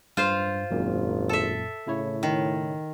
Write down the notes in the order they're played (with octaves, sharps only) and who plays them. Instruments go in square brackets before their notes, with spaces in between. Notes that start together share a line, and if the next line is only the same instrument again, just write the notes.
[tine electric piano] G2 [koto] F4 C5 F5
[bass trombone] G#1 [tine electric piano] F#2 A#2
[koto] A4 E5
[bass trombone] A2 [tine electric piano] C#3 E4 C#5
[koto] D#3